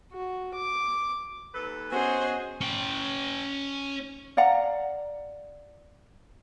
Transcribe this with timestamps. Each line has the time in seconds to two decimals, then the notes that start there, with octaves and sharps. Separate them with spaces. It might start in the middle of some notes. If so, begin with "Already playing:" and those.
0.12 F#4
0.55 D6
1.54 D#2 A4 B4
1.92 B3 C#4 F#4 G#4 C5 D#5
2.61 C#4 G5
4.37 D5 F5 F#5 A#5